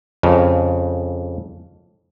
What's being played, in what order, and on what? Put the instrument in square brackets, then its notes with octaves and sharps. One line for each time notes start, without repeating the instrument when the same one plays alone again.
[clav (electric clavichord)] F2 C#3